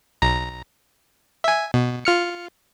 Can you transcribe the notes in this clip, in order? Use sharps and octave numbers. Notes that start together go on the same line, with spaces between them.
B1 A#5 A#6
E5 G#5
B2
F4 F6 C#7